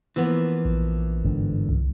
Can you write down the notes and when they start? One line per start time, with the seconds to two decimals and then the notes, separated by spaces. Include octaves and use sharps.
0.16 E3 F3 A#3 B3
0.65 A#1
1.23 G1 G#2 D3
1.69 C2